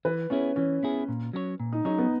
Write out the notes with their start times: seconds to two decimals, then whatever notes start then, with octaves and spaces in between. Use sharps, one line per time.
0.05 E3 B4
0.30 B3 C#4 E4 G#4
0.56 E3 C#4
0.83 B3 E4 G#4
1.09 A#2
1.33 F#3 C#4 G#4 C#5
1.60 A#2
1.73 D#4
1.85 F#3 C#4 D#4 G#4 C#5
1.98 B3